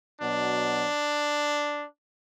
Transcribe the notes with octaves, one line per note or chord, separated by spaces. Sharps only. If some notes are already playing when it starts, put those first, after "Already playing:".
B2 F#3 D4